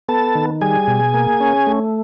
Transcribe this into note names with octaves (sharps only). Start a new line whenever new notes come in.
B3 A4 A5
D#3
G3 G#4 G#5
B2
A#3
C#4
A3